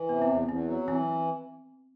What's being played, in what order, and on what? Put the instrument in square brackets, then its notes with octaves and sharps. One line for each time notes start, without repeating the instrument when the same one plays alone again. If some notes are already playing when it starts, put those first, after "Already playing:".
Already playing: [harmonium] E3
[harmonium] C3 [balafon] B3
[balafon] C4
[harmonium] E2
[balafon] C4
[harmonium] E2 [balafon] C4
[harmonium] F#3
[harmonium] E3 [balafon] C4